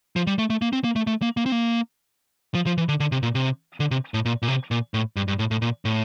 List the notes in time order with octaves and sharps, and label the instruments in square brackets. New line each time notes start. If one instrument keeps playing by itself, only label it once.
[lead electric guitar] F3
G3
A3
A3
A#3
C4
A#3
A3
A3
A#3
A#3
C4
A#3
F3
F3
E3
D3
D3
C3
A#2
C3
D3
C3
A2
A#2
A#2
C3
A#2
A2
G2
G2
A2
A2
A#2
A2